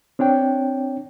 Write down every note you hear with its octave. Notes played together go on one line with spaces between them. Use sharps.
C4 D4 C#5 G5